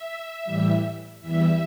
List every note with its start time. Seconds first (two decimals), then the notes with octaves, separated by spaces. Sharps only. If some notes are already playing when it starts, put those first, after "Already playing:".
Already playing: E5
0.45 A2 E3 G3
1.21 E2 E3 G3 E5